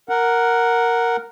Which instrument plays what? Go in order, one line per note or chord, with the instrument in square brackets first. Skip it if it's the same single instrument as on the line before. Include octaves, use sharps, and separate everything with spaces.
[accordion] A#4 F#5